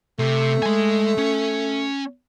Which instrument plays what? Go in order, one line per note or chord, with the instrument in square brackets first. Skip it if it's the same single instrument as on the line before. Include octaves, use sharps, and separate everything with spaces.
[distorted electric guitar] C3 [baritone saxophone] A3
[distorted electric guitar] G#3 G#5
C#4